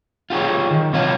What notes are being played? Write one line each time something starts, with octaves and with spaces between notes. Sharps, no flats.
F4 G4 G#4 C#5
D#3
C3 F#3 F4 C#5 F5